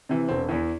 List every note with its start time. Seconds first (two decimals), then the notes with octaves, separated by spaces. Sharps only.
0.09 C3 E3
0.29 E1 C4
0.49 E2 E3